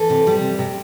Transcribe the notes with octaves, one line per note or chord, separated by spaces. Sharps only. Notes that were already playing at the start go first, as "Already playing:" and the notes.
Already playing: E3 A4
C3
G3
C3
C3